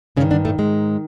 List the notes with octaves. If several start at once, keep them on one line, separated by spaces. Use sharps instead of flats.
G2 C#3 D#3 C#4
D3 D4
A2 A3
G#2 G#3